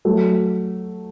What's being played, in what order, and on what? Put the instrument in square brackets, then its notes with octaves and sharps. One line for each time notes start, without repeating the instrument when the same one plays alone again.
[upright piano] F#3 A3